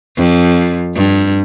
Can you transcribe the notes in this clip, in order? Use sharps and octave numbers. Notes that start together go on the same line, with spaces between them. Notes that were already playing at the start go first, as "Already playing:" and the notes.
F2
G2